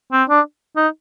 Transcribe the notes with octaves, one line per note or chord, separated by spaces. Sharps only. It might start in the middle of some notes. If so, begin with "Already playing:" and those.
C4
D4
D#4